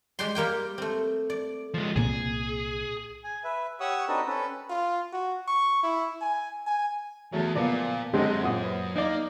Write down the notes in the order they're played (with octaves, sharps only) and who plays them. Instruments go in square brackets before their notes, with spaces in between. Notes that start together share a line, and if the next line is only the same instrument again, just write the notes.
[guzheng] G#3 G4 D5 G5 C6
G3 A#3 G4 G5
A3 C4
D5
[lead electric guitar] F3 G#3
[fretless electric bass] C2 A#2 A#3 [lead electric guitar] G#4
[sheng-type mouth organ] G#5
B4 E5
G4 C#5 F#5 C#6 D#6 E6
C4 D4 D#4 F#4 A4 B4
C#4 A4 B4
[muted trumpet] F4
F#4
C#6
E4
G#5
G#5
[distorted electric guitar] E2 [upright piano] F#3 A3 G#4
[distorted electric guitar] A#2 [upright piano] F3 A#3 B3 [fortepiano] D5
[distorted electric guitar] F#2 [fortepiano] D3 G#3 C4 [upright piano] G4 D#5
[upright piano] A#2 F#5 D#6 [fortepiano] C5
[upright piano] B4
[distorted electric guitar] A#3 [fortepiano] D#4 D5